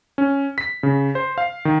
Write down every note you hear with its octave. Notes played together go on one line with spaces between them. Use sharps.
C#4
B6
C#3
C5
F5
D#3